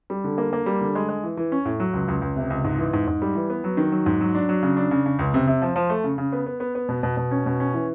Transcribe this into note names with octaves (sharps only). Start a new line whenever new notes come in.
G3
D3
A#3
A#3
G3
D3
G#3
G#3
E3
E3
C#4
A2
F#3
C#2
C#2
C#2
C3
C#2
G#2
E3
G#2
G#2
G3
E3
B3
F#3
D#3
F#3
G#2
F#3
D4
F#3
C#3
D4
C#3
C#3
C#2
C3
C3
F3
F3
A3
C#3
C#3
B3
B3
B3
B3
B2
B2
B2
C#4
B2
C#4
E3